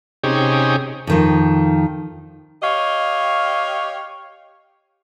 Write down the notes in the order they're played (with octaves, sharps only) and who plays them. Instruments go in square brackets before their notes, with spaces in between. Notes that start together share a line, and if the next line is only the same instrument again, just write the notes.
[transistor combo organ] C3 C#4 D#4 G4 G#4
[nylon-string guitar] F2 D#3 F3
[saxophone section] G4 C#5 D#5 F5